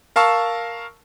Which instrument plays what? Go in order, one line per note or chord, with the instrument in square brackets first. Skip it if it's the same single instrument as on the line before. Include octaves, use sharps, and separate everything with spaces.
[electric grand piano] A#4 F5 A5 C#6 E6